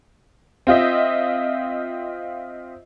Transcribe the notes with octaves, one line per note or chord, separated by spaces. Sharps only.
C4 F4 D#5 E5